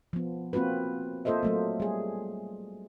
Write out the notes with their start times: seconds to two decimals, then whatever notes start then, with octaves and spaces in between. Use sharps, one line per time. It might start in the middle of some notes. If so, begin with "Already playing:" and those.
0.13 F3 B3
0.53 A#3 C4 F4 F#4 B4
1.25 A#3 F4 A4 C5 D#5 E5
1.43 F#3 A3 A#3
1.80 G3 G#4